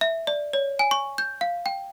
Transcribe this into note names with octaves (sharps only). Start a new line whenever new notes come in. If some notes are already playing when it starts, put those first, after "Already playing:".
E5
D5
C#5
G#5
C#6
G6
F5
G5